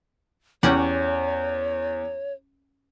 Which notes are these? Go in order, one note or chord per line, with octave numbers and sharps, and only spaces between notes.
E2 C#4 G4 C#5 F#5